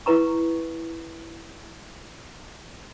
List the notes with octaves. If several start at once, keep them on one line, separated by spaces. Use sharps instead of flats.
E4 B4 A#5 C#6